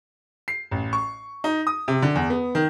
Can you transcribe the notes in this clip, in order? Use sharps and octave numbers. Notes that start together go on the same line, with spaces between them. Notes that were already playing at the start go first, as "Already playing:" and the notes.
C7
A1
C#6
D#4
D#6
C3
D3
E2
B3
D#3